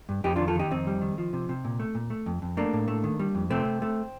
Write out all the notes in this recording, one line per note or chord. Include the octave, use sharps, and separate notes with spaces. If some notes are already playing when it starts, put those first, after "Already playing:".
G2
F2 D#4 G4
D#3 D4 F4
F4 A4
D#3 D#4 G4
F2 C4 D#4
G3
D#3
F3
C3
C3
A#2
A3
A#2
A3
F2
F2
A3 A#3 D4
A2
A3
D#3
G3
F2
C3 A3 C4
C3
A3